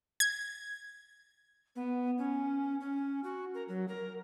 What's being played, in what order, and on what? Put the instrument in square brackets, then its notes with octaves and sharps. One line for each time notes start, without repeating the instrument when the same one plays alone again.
[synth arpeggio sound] G#6
[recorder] B3
C#4
C#4
F#4
A#4
F#3
A#4